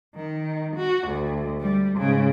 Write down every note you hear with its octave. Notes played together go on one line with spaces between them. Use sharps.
D#3
F#4
D2
G3
G#2 C#3